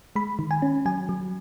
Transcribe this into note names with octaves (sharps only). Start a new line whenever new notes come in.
G#3 B5
D#3
G#5
C#4
F#3 G#5
F#3